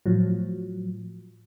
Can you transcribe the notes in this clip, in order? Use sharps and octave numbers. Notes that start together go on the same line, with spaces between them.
A2 F3 F#3